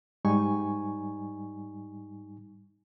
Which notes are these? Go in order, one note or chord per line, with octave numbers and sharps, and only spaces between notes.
G#2 G3 D#4 G#5 C#6